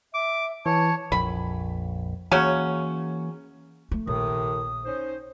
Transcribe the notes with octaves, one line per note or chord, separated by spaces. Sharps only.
E5 D6
E3 C#5 A5
A#1 F2 B5
C#3 E3 F#3 A#3 C#4
A3
A#1 A2 C3 D#3 D#6
C#4 D#4 C5